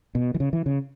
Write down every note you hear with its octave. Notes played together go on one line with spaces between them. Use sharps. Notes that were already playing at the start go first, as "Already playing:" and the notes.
B2
E3
C#3
E3
C#3